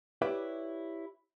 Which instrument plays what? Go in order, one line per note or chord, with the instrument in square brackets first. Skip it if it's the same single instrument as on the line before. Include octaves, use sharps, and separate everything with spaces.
[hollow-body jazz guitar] E4 G4 B4 C#5 D5 E5